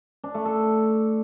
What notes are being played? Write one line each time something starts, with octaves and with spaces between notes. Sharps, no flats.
D4
A3
A4